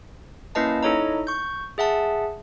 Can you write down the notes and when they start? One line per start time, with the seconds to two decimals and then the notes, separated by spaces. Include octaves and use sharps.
0.55 A#3 C#4 E4 B4 D#5 A5
0.83 D#4 E4 A4 C#5 D#5 A#5
1.27 C#6 G6
1.78 G#4 E5 F#5 A5